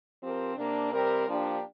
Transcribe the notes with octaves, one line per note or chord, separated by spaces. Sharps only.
F3 C4 G4 A#4
C3 A#3 D4
C3 G3 C4 A#4
F3 A#3 D4 G4